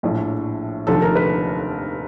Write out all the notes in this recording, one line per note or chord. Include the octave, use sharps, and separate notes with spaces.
A#1 A2 F3
F1 D#2 D3 F3 A4
A#4
B4